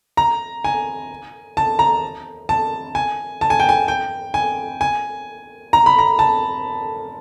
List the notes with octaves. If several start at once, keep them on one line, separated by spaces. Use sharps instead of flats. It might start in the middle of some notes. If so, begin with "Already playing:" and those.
A#5
G#5
A5
A#5
A5
G#5
A5
G#5
G5
G#5
G5
G#5
G#5
A#5
B5
A#5
A5